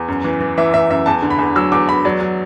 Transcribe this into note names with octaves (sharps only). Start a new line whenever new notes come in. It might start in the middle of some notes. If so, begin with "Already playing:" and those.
Already playing: E2
F#2
E3
E3
E3 E5
E3 E5
F#2 E5
E2 A5
D3
B5
E2
F#3 E6
E2 D6
E2 B5
F#3 D5
F#3